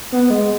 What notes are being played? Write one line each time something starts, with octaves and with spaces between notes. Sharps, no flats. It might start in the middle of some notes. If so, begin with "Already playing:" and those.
B3
G#3